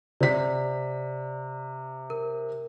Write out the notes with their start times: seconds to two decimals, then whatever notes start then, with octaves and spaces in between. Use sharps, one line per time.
0.21 C3 D5 B6
2.10 A#4